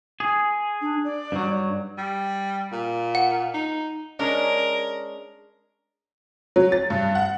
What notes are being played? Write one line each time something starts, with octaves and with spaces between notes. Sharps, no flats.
G#4
D4
D5
G2 F#3
G3
A#2
F#5
D#4
G#3 C#4 D4 A#4
F#3
A6
G2
F#5